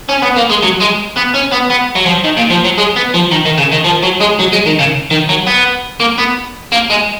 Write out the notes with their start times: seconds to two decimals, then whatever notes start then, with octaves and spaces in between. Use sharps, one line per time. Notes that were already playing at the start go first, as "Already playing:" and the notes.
0.09 C#4
0.22 B3
0.37 A#3
0.50 G#3
0.63 F#3
0.81 G#3
1.17 B3
1.35 C#4
1.52 B3
1.70 B3
1.95 F#3
2.06 F3
2.24 D#3
2.37 A#2
2.51 F3
2.65 F#3
2.78 G#3
2.96 B3
3.14 F3
3.31 D#3
3.45 D#3
3.58 C#3
3.72 D#3
3.85 F3
4.03 F#3
4.21 G#3
4.39 F#3
4.52 G#3
4.66 D#3
4.79 C#3
5.11 D#3
5.29 F#3
5.47 B3
6.00 A#3
6.18 B3
6.72 A#3
6.90 G#3